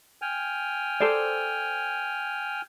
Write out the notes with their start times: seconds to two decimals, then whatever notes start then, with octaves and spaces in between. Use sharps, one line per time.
0.22 G5 G#5 F6
1.00 A4 C5 D5